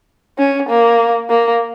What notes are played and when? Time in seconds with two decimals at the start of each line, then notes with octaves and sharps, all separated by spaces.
0.38 C#4
0.69 A#3
1.30 A#3